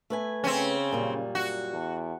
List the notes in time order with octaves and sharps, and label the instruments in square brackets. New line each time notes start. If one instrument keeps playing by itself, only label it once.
[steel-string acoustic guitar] A3 B4 G#5
[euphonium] C#3 [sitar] C4 C#4
[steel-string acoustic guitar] F#2 A#2 G3
[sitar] F#4
[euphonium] E2